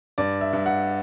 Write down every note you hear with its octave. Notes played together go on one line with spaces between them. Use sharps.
G2 D5
E5
G2
F#5